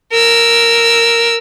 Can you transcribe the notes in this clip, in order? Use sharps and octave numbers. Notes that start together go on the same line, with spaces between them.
A#4 E6